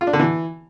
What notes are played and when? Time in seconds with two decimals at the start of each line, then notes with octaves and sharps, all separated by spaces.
0.01 F4
0.07 D4
0.13 D3
0.19 E3